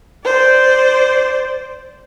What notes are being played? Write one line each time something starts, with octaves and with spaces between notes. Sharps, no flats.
C5 D5